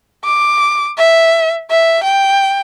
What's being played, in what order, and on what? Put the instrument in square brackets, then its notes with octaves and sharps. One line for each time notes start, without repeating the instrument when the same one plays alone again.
[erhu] D6
E5
E5
G5